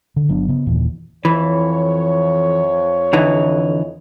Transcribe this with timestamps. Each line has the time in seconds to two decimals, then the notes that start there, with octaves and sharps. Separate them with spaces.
0.16 D3
0.29 G1 F#3 B3 D4
0.48 C#3 B3
0.66 F#1 D#2 A#2 E3
1.25 F2 E3 C#5
3.13 D3 E3 D#4